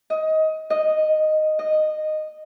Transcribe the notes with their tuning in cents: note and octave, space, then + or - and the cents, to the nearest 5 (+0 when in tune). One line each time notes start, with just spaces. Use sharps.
D#5 +20
D#5 -5
D#5 -10